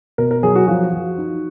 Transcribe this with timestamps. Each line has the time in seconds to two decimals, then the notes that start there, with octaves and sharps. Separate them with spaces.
0.18 B2 A#4
0.31 A#4
0.43 F#3 G#4
0.55 F#4
0.67 F3 F#4
0.93 F3
1.18 D#4